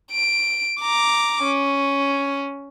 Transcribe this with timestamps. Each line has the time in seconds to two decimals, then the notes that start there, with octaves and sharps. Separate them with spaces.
0.12 D7
0.81 A#5 D6
1.44 C#4